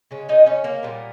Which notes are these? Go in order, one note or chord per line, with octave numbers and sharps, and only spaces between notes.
C#3 G#3 C#4
D#4 D#5
C#4 C#5
A#3 A#4
A#2 G3 B3